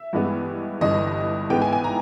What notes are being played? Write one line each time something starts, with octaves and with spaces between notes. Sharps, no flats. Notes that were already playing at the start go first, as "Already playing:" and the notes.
Already playing: E5
G2 E3 G#3 B3
G1 G2 E3 D#5
G#2 E3 G#3 B3 G5
G#5
G#5
A#5